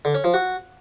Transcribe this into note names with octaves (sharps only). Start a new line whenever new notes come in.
D3
C#4
F3
F#4